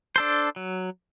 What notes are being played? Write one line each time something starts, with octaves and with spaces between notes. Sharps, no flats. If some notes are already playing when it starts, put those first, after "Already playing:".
D4 A4 C5
F#3